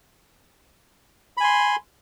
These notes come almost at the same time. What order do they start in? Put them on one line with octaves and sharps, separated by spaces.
B5 G#5 C6